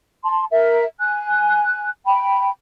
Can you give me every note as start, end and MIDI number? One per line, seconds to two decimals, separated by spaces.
0.24 0.44 81
0.24 0.44 84
0.51 0.83 70
0.51 0.83 76
1.00 1.89 80
1.00 1.89 90
2.06 2.49 79
2.06 2.49 83